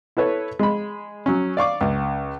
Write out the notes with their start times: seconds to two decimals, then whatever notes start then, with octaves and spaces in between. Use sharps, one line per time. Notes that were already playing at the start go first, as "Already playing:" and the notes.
0.17 E4 A4 B4 C#5
0.59 G#3 B5
1.26 F#3 C#4
1.57 D5 F5 C#6 D6
1.81 C#2